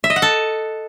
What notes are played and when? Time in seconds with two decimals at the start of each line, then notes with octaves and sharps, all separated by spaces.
0.04 E5
0.10 D#5
0.16 F#5
0.22 A4